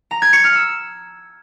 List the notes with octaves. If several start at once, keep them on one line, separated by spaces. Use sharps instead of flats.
A#5
G#6
C#7
F6
E6